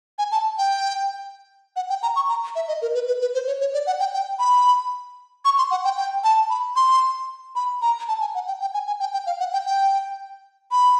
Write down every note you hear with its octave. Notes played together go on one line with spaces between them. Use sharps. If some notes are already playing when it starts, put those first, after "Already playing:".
G#5
A5
G5
F#5
G5
A#5
C#6
A#5
E5
D#5
A#4
B4
B4
B4
C5
C#5
C#5
D5
F#5
G5
G5
B5
C#6
C6
F#5
G5
G5
A5
B5
C6
B5
A#5
A5
G#5
F#5
G5
G5
G#5
G#5
G5
G5
F5
F#5
G5
G5
B5